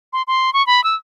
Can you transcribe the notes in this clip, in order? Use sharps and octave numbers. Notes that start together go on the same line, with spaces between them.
C6
C6
C#6
B5
E6